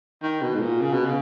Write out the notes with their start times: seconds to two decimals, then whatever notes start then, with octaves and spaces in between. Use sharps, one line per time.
0.22 D#3
0.42 B2
0.55 G#2
0.61 A#2
0.81 C#3
0.93 B2
1.06 C#3